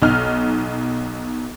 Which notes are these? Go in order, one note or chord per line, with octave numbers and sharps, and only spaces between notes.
B1 D#4 F6